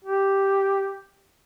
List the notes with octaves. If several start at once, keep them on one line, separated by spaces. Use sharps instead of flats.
G4